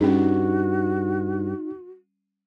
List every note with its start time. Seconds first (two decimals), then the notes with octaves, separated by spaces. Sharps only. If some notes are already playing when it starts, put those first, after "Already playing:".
0.01 G2 G3 C#4 D#4 F#4 G#4